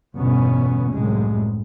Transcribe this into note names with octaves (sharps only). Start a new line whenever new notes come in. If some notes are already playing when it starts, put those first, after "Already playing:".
G1 E2 B2 B3 C#4
C2 F#2 A2 G#3